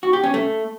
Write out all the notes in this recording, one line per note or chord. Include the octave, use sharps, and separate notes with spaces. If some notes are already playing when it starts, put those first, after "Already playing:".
F#4
G4
C#4
A3